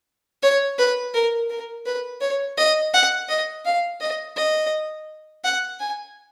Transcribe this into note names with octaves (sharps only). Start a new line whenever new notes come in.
C#5
B4
A#4
A#4
B4
C#5
D#5
F#5
D#5
F5
D#5
D#5
F#5
G#5